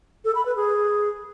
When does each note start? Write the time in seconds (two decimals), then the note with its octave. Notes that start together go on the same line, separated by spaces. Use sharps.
0.25 A4
0.35 B5
0.45 B4
0.56 G#4